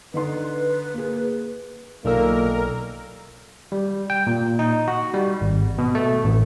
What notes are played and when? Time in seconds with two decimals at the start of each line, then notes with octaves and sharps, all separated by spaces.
0.14 D3 D#4 B4 C6
0.93 A#3 G#4
2.05 B1 A#2 D#3 A#3 A4 A#4 E6
3.72 G3
4.10 G5
4.27 A#2
4.59 D#4
4.88 F#4
5.14 G3
5.41 G#1
5.78 B2
5.95 A3
6.24 A1